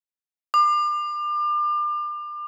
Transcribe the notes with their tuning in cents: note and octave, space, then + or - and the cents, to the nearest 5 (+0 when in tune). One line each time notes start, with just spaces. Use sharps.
D6 +35